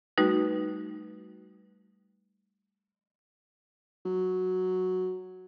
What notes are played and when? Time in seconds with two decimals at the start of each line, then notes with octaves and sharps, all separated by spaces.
0.18 G3 A3 D#4 F#4 B4
4.05 F#3